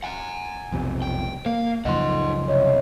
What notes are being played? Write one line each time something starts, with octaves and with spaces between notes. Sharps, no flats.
F#5 G#5
B1 F2 C3
G5
A#3 F5
C#2 F#2 F3 D#4 D#5 F#5 C6
C2 C#5 D#5